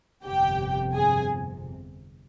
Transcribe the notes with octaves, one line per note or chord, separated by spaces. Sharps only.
G1 F2 C3 G4 G5
G#4 G#5